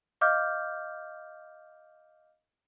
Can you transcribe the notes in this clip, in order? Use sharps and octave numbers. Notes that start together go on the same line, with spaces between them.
D#5 F5 D6 F6 G6